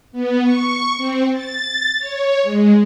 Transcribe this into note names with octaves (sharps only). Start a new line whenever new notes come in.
B3
C#6
C4
A6
C#5
G#3